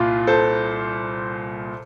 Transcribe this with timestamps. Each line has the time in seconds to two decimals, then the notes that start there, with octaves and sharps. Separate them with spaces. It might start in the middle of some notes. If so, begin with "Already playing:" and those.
Already playing: C2 A#2 F4
0.27 A4 C5